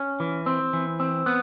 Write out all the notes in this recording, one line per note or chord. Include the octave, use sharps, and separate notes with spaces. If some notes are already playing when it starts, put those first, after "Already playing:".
Already playing: C#4
E3
C4
E3
C4
B3